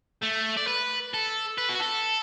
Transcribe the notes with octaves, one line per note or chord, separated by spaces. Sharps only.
A3
D5
B4
A4
B4
F#4
A4